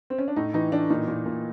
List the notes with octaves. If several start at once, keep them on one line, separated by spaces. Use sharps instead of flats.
C4
C#4
D4
A2 D#4
E3 D#4
E3 D4
A#2 D#4
A#2
A#2